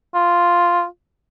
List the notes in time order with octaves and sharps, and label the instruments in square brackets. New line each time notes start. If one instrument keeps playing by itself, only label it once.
[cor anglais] F4